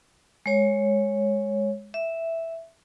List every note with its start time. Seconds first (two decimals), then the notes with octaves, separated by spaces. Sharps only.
0.46 G#3 C#5
1.94 E5